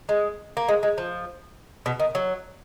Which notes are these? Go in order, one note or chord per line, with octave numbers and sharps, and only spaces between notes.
G#3
A#3
G#3
G#3
F3
B2
D#3
F#3